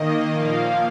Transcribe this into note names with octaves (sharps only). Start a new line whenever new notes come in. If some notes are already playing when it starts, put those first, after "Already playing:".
Already playing: D#3 A#3 D#5
A#2 F3 A#3 F5